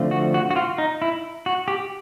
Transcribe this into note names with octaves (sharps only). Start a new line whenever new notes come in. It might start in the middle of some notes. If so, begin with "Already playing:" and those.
Already playing: D3 F3 A3 C4
F#4
F#4
F#4
F4
D#4
E4
F#4
G4